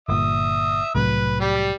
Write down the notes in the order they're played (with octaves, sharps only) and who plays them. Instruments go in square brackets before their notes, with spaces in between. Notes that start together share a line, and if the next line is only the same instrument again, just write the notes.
[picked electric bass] G1 A#2 [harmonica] E5 D#6
[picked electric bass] C2 A2 F#3 [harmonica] B4
[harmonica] G3 G4